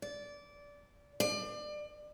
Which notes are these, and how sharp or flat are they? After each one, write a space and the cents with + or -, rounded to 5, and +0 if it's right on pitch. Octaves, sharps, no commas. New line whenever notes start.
D5 -20
D5 +30